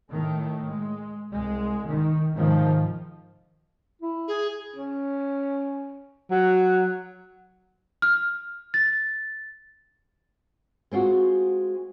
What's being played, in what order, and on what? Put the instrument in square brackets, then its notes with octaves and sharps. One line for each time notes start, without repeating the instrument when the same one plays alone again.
[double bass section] A2 D#3 A3
G#3
C2 G#3
D#3
G#2 C3 D#3 F3
[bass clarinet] E4
[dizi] G#4
[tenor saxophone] C#4
F#3
[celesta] F6
A6
[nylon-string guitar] G#3 C4 F4 F#4